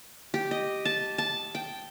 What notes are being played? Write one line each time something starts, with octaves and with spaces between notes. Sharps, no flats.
G4
D#5
A5
A5
G5